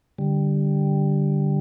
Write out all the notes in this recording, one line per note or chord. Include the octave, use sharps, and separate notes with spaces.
D3 G3